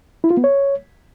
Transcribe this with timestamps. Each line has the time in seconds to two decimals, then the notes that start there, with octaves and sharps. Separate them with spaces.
0.24 E4
0.31 F4
0.37 B3
0.44 C#5